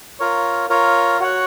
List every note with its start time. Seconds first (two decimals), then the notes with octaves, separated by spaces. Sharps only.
0.19 F4 A#4 C#5
0.70 F4 A#4 C#5
1.20 F#4 C#5 F#5